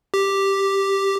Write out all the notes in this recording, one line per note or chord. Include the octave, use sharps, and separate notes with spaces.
G4